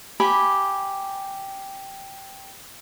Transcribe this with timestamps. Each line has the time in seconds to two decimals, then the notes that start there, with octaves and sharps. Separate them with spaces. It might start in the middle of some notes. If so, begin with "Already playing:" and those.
0.20 G4 G#5 B5 D6